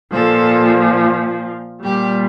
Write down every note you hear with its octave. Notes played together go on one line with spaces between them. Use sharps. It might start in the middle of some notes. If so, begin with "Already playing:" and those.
A#2 F3 A4
A#2 G3 G4